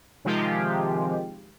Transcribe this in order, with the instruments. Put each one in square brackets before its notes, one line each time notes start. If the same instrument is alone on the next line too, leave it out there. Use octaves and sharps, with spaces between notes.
[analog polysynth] C3 D#3 F3 G#3 F4 G4